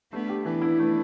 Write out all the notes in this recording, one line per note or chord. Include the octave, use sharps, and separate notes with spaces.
A3 B3 D4
G4
E3 B3 D4
E4
A3